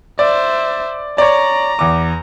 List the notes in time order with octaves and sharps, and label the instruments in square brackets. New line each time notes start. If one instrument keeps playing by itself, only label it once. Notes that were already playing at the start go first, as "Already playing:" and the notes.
[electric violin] C5 E5 [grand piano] D5
[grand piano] C#5 D5 [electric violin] A#5
[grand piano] E2 D6